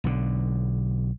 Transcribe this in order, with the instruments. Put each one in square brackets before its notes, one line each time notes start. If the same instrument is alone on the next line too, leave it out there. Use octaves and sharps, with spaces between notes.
[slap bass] B1 D3